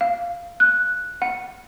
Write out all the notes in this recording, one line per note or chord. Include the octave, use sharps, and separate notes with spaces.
F5
F#6
F#5